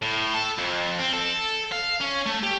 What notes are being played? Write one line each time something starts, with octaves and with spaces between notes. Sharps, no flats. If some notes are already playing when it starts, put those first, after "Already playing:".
A2
A4
F2
C4
A4
F5
C#4
A3
G4